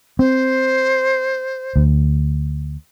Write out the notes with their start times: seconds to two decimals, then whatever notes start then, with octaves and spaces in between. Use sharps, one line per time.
0.19 C4 C5
1.76 D2